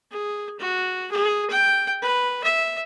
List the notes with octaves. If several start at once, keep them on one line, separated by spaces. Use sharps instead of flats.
G#4
F#4
G#4
G5
B4
E5